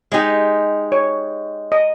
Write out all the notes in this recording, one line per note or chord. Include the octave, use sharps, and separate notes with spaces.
G#3 D#4 G4 D#5
C#5
D#5